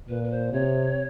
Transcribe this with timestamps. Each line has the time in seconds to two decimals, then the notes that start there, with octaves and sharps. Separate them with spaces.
0.08 A#2 B4
0.23 B4
0.30 C5
0.52 C3 C#5